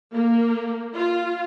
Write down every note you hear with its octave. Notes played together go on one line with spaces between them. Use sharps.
A#3
F4